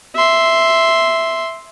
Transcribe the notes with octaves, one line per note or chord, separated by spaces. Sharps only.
E5 C6